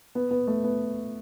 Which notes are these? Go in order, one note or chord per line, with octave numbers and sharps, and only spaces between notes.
B3
B3
A3
B3